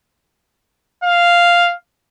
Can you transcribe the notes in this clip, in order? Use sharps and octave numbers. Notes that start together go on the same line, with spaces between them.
F5